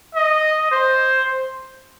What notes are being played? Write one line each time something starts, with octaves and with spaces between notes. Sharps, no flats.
D#5
C5